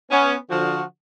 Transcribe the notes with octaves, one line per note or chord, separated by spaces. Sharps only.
B3 C#4
D3 F3 F#4